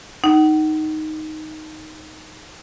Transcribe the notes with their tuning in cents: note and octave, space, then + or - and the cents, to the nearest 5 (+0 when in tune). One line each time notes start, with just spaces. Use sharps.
D#4 +0 F#5 +35